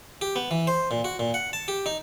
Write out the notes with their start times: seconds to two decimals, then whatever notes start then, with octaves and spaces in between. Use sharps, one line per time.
0.21 G4
0.36 B3
0.51 E3
0.67 C5
0.91 A#2
1.04 F#4
1.19 A#2
1.34 F#5
1.53 A5
1.68 G4
1.86 D#4